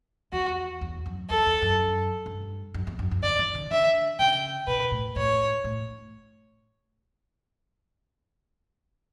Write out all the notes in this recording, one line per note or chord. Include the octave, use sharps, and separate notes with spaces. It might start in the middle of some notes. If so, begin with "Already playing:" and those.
E2 F#4
E2
F#2
E2 A4
E2
F#2
G2
F#2
E2
F#2
F#2
D3 D5
E3
D3
D3 E5
C#3 G5
B2 B4
A2
A2 C#5
A2